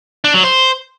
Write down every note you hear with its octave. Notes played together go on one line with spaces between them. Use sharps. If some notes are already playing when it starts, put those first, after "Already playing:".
D4
F#3
C5